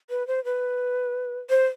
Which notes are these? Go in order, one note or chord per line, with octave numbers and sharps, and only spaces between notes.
B4
C5
B4
C5